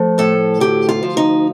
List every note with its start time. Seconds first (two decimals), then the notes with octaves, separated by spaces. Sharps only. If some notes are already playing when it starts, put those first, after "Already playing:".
Already playing: F3 A3
0.18 A2 A4
0.60 D2 G4
0.89 F4
1.03 F3
1.17 D#4